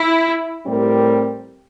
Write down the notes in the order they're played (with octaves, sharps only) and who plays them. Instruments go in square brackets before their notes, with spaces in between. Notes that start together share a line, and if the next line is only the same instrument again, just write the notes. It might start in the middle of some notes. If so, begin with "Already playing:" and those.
Already playing: [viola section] E4
[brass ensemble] A2 G3 C4 G4 A#4